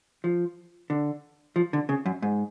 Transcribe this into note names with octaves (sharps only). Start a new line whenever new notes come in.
F3
D3
F3
D3
C#3
F#2
G#2